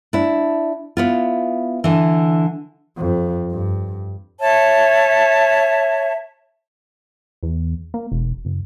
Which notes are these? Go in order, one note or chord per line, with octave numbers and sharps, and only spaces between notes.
D4 E4
B3 E4 F4
D3 E3
F2
G2
C#5 E5 A5
E2
A#3
E1
F#1